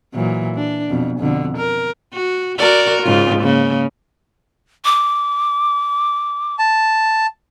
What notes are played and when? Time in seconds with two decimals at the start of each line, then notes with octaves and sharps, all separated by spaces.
0.14 A#2 E3 F#3
0.55 D4
0.89 F2 B2
1.18 F2 B2 D3
1.57 A#4
2.14 F#4
2.58 F#4 A#4 D5
3.03 G#2 C#3 F4
3.42 C#3 A#3
4.85 D6
6.59 A5